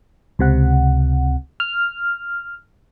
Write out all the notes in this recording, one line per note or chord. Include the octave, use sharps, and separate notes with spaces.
C#2 C3 F#5
F6